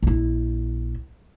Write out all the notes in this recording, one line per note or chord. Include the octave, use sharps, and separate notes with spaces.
A#1 E4